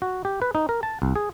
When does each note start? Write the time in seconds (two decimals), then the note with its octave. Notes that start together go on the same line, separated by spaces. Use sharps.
0.02 F#4
0.25 G4
0.42 B4
0.55 D#4
0.69 A#4
0.83 A5
1.02 C2
1.16 G#4